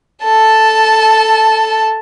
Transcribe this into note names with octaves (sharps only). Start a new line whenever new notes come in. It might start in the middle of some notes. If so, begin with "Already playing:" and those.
A4 A5